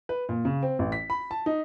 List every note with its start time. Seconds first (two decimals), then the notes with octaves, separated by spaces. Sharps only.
0.09 B4
0.29 A#2
0.45 C#3
0.63 C4
0.79 A1
0.92 B6
1.10 B5
1.31 A5
1.46 D#4